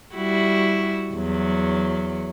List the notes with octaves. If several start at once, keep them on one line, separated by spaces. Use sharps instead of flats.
G3 E4 F#4
E2 F#3